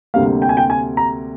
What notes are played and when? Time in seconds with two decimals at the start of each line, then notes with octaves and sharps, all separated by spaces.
0.14 D2 C3 G3 A#3 F5
0.42 G5
0.49 G#5
0.57 G5
0.70 G#5
0.97 A#5